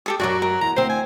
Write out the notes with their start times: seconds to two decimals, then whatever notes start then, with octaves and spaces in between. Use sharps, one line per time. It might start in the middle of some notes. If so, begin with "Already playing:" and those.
0.06 G4 A4 D#6
0.20 F#2 F#3 F#4 A#4 C#5 D5
0.42 A#4
0.61 E2 A#5
0.76 D2 C4 C5
0.89 G#5